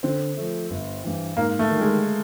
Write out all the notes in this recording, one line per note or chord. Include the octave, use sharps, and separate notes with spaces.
D3 C4
F3 A3
G1
G2 E3
G#2 A#3
A3
D#3 G3
G#3